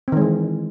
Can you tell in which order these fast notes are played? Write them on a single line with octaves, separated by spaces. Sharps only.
C4 D#3 G#3 E3